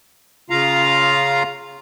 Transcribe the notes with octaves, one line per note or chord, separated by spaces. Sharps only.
C#3 F4 F5 A#5